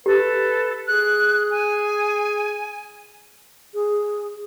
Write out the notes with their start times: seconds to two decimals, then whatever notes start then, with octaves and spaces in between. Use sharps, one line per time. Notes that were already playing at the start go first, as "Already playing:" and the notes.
0.06 G4 A4 B4
0.88 G#4 F#6
1.51 G#5
3.74 G#4